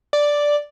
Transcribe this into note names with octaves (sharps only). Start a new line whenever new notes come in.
D5